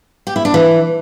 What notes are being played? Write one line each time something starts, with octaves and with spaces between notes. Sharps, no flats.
G4
E4
D4
E3